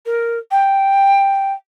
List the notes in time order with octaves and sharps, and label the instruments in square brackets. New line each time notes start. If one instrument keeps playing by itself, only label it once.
[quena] A#4
G5